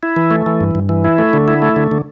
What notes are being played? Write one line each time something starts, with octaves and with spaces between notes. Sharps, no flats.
E4
E3
A3
E3
G2
G2
E3
E4
A3
D3
E4
A3
D3
D3